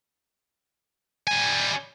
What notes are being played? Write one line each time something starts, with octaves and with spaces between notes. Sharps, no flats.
G3 G#5